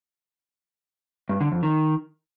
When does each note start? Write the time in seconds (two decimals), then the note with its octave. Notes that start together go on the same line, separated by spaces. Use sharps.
1.29 G2
1.41 D3
1.52 F2
1.63 D#3